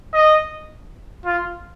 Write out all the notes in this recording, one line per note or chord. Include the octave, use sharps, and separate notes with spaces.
D#5
F4